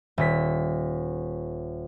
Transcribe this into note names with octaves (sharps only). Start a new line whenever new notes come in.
D#1 B6